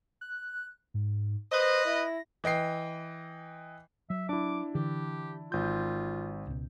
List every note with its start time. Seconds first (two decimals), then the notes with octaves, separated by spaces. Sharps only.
0.21 F#6
0.94 G#2
1.51 B4 C5 D#5 A#6
1.85 E4
2.44 E3 D#5 G5 C7
4.10 F#3 E5
4.29 D4 E4 D6
4.75 D3 E3 G4
5.52 G#1 F4 G6
6.47 C#2 B2